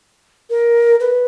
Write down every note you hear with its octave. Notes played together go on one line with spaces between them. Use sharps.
A#4
B4